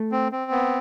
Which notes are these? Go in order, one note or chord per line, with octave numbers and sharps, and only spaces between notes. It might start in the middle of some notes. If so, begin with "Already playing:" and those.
Already playing: A3
C4
C4
B3